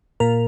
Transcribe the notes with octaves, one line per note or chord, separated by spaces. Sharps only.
A#2 A#4